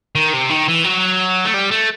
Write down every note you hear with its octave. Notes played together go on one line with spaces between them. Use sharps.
D#3
C3
D#3
E3
F#3
A3
G3
A3